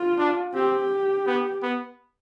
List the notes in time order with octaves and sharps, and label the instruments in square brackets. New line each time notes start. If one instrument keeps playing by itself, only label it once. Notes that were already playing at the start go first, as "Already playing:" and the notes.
Already playing: [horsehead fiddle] F4
[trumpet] D4
[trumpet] C4 [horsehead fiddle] G4
[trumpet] B3
B3